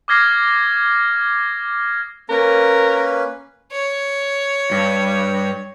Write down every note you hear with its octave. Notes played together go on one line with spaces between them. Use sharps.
D6 D#6 F6 G#6 A#6 C7
A#3 C#4 A#4 B4
C#5
G2